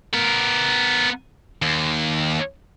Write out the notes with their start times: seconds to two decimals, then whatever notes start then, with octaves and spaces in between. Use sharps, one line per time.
0.14 B3 A#4
1.62 D#2